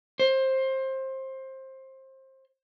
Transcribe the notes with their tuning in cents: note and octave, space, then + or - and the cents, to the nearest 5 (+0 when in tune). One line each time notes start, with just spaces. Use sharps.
C5 +20